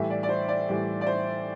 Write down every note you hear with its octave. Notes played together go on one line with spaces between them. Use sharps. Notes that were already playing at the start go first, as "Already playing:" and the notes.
Already playing: A2 E3 G3 E5
D5
D5
C5
D5
A2 E3 G3
D5
C5